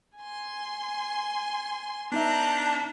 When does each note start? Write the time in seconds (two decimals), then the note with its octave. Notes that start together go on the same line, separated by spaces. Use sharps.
0.17 G#5 C6
2.12 B3 D4 D#4 E5 A#5 F#6 G6